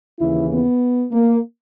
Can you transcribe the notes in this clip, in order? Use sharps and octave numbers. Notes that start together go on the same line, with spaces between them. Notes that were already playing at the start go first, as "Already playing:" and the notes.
D#2 C#3 E3 E4
B3
A#3